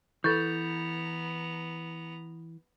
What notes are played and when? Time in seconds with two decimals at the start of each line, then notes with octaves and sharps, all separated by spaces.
0.24 E3 B3 A4 A#5 C#6 G6 A6